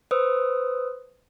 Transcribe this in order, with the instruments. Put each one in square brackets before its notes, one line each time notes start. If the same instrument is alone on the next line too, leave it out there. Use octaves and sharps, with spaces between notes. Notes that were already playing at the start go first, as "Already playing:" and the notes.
[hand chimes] B4 C5 D#6 E6